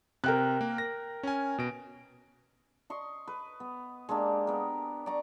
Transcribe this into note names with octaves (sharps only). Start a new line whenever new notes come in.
C3 A#4 G5 F#6
A#3
A#6
C#4 G#5
B2 D7
D#5 C6 C#6
B4
B3
G#3 A#3 D4 G4
B3 A#4
D5 A#5 C#6